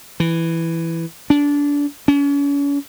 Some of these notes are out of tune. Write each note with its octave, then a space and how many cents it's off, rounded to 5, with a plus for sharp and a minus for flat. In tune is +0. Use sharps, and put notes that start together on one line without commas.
E3 +5
D4 -25
C#4 +40